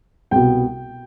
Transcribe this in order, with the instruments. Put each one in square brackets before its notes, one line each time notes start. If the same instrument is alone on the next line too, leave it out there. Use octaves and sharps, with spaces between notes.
[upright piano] C2 B2 G5